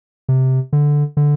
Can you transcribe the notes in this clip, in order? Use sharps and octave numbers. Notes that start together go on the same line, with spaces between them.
C3
D3
D3